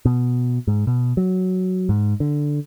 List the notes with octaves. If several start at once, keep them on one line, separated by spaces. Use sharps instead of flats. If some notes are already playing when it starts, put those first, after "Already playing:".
B2
G#2
B2
F#3
G#2
D3